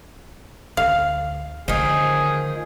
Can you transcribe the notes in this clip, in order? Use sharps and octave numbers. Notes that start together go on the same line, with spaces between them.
D2 F5
D3 D#3 F3 A3 G#4